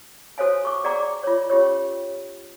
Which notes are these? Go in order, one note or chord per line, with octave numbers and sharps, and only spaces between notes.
F#4 A4 C5 C#5 F5 G#5
C#6 D6
G#4 D5 F#5 G5 A#5 D6
F4 C#5
C#4 F4 G4 C#5